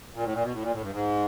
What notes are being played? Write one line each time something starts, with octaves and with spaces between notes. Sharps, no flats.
A#2
A2
A#2
B2
A2
A#2
A2
G2
G#2